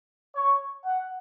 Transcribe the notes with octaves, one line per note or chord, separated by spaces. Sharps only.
C#5
F#5